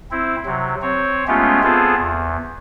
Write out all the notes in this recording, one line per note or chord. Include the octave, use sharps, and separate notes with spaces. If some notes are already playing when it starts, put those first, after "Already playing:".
C4 E4
C3 F#3
C4 C#5
G#3 A3 B3 C#4 F4 G4
B3 C4 F4 G#4 A4
E2